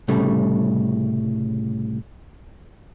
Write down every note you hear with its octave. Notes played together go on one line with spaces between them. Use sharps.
C2 A2 C#3 G3 A3